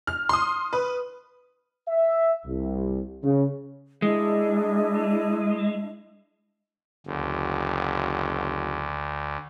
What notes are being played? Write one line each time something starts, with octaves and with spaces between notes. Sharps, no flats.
F6
C6 D#6
B4
E5
C2
C#3
G#3 D4 E4 D#5
F#1 D2